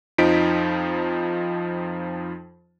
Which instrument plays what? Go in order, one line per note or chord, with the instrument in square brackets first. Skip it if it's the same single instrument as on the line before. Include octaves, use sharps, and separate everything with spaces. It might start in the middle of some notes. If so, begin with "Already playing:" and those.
[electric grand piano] F2 F3 D#4 B6 D7